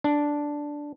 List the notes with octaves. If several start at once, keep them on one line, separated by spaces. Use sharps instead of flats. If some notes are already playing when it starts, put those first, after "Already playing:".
D4